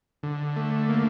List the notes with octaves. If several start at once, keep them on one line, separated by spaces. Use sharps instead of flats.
D3
A3
A#3